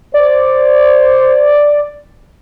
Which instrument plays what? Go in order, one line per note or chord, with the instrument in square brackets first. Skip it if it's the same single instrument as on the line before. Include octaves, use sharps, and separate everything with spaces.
[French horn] C5 [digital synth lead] D5